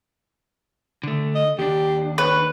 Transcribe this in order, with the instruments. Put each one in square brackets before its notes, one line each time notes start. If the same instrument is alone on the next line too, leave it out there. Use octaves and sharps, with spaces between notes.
[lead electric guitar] D3 A3
[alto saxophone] D#5
[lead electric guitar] D#2 D4 [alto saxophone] G4
[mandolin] B4 [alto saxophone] C#5